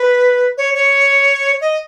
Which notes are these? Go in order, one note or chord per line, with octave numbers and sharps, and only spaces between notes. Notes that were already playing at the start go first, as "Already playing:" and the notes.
Already playing: B4
C#5
C#5
D#5